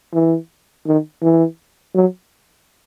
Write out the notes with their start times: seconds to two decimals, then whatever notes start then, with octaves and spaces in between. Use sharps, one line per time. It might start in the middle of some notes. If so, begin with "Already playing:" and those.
0.13 E3
0.87 D#3
1.22 E3
1.95 F#3